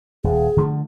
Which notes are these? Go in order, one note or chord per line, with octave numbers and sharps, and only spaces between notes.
D#1 G#4
D3 F3 A3